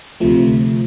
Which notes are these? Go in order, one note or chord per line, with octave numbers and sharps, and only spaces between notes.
D2 C3 F3 A3